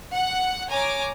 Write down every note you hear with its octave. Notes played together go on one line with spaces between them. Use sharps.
F#5
C#5 G#5 A#5 D6